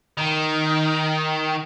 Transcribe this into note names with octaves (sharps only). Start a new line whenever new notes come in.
D#3